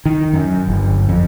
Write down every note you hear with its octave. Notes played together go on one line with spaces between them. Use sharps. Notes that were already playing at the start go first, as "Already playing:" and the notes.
D#3
F#2
G1
F2